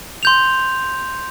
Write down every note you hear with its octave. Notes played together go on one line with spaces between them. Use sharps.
C6 G6 F7